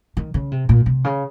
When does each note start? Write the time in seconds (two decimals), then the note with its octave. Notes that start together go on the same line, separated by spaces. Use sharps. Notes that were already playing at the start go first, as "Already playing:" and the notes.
0.17 D#3
0.34 C#3
0.51 C3
0.69 A#2
0.86 C3
1.04 C#3